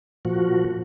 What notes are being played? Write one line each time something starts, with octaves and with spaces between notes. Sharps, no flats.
A#2 F3 F#4